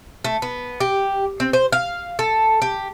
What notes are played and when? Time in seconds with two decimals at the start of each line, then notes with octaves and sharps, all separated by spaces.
0.24 A3
0.42 B3
0.80 G4
1.40 C4
1.53 C5
1.72 F5
2.19 A4
2.62 G4